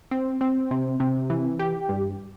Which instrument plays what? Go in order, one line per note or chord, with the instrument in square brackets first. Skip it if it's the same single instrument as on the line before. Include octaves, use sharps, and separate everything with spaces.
[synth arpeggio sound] C4
C4
C3
C3
E3
G4
G2